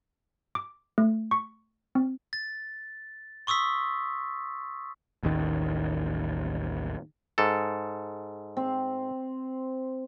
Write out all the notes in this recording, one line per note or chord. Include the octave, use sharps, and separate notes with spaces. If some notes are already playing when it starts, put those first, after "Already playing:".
D6
A3
C#6
C4
A6
C6 C#6 D#6 E6 B6
A1 D#2 D#3
G#2 A4
C4